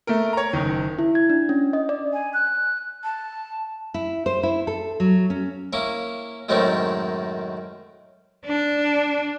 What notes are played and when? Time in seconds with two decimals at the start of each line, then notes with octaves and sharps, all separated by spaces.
0.07 A3 A#4
0.33 C#5 A#5
0.53 F#1 D#3
0.99 E4
1.15 G#6
1.30 D4
1.49 C#4
1.73 D#5
1.89 D5
2.13 G#5
2.34 F#6
3.04 A5
3.94 E4
4.26 C5
4.43 E4
4.67 A4
5.00 F#3
5.30 C#4
5.73 A#3 C#4 E4
6.49 F#2 A2 D#3 G#3 C4 C#4
8.45 D4